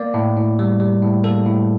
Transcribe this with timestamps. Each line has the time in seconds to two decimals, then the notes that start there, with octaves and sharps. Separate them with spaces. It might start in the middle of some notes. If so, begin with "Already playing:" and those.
Already playing: A#3 D5
0.14 A2
0.37 A2
0.59 G3
0.80 G3
1.03 A2
1.24 A#3 A4
1.46 A2